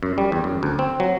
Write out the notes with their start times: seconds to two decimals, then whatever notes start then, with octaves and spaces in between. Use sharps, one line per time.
0.03 F#2
0.18 G3
0.32 E2
0.44 F#2
0.63 D2
0.79 C4
1.00 F#3